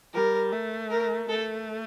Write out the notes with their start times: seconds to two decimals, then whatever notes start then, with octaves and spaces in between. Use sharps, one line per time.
0.14 G3 A#4
0.52 A3
0.90 A#4
1.28 A3 A4